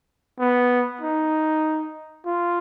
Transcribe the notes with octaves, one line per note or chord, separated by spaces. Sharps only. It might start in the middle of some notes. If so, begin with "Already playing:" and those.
B3
D#4
F4